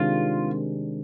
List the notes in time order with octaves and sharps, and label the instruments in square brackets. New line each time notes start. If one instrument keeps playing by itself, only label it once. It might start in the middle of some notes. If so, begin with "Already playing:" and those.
Already playing: [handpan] C3 D#3 G#3 D4 [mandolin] F4